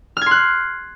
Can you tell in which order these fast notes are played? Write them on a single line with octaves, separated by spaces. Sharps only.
F6 G#6 C6 F#6